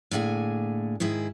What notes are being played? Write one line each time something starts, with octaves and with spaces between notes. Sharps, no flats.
A2 D3 A#3 G#4 G#5
G#2 D#3 E4 G#4